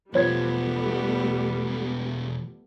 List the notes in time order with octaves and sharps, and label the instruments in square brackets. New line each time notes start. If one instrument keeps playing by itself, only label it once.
[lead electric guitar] E2 B2 [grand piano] F3 C5 G#6 [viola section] G3 A3 [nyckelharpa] B3